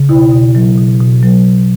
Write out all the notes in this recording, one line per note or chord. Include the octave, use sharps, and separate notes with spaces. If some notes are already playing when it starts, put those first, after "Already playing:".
Already playing: C#3
B2 E4
B2
F#3
B2
B2
F#3